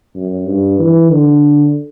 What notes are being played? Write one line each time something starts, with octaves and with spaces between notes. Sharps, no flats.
F#2
G2
E3
D3